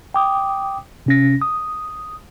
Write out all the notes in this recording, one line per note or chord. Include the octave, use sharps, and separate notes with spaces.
G5 D6 D#6
C3 C#4 A#6
D#6